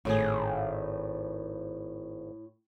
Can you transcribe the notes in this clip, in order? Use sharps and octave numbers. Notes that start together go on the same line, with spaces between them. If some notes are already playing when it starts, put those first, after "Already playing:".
G#1 A2 G#4